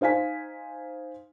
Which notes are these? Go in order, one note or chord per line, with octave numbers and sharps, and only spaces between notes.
D#4 C5 F5 G#5 B6